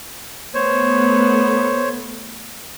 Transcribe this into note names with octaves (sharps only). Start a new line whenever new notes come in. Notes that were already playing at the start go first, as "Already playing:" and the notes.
A3 B3 C5 C#5